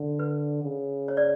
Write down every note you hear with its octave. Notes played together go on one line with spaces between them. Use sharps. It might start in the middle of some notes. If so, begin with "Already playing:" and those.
Already playing: D3
B4
C#3
C#5
D5